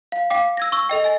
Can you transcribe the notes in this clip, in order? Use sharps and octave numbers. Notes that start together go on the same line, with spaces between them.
F5
F5 G5 D6
E6 G#6 A#6
C#6 E6
A4 D#5 G5
D#5 G#5 A6